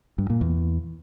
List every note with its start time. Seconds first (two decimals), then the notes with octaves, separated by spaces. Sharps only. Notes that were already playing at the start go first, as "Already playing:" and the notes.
0.18 G2
0.30 A#2
0.41 E2